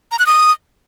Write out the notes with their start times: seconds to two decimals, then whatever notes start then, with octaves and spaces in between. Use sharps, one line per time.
0.11 A#5
0.19 F#6
0.26 D#6